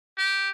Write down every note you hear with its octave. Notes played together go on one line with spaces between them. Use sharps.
G4